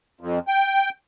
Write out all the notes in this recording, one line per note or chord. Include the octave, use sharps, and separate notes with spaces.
F2
G5